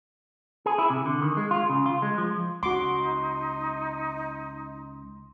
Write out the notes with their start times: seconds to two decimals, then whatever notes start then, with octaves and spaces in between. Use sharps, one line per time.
0.66 G#4
0.78 E4
0.90 C3
1.06 D3
1.22 D#3
1.37 G#3
1.51 F4
1.70 C#3
1.86 F4
2.02 G#3
2.18 F3
2.63 C#2 D#4 F#4 C6 D6